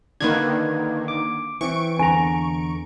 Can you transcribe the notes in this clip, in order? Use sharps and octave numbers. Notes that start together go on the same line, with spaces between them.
D3 D#3 A#3 B4 G#6
D6
E3 C4 C#6 D7
E2 D3 G#5 A#5